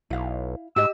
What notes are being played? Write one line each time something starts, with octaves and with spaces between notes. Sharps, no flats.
B1 E4 F5
G#2 G4 D#5 E6